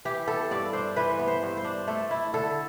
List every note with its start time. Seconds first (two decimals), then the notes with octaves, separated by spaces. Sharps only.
0.05 E3 G4
0.27 B3 A4
0.51 G2 D5
0.73 D4 C5
0.96 E3 B4
1.19 B3
1.28 C5
1.43 G2
1.57 C5
1.64 D4
1.87 A3 A4
2.11 E4
2.34 D3 A4